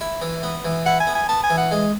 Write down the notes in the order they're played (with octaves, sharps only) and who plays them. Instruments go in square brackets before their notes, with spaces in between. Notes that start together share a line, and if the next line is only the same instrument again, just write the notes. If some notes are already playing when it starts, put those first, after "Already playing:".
[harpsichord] E4
E3
B3
E3
[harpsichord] E4 [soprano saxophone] F#5
[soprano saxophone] G#5
[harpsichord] B3
[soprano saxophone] G#5
[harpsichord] B3 [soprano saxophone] A5
[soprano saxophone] G#5
[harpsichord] E3
[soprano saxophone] F#5
[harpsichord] G#3